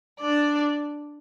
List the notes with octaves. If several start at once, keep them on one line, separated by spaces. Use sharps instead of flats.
D4 D5